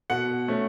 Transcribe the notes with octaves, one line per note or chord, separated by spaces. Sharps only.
B2 F#5
A3 C#4